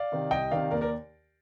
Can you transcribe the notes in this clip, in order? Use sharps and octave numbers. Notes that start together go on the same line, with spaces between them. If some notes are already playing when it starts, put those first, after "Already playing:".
Already playing: D5 F5
C3 D#3
C2 D#5 G5
C3 D#3 D5 F5
D#2 A#4 D5
A#4 D5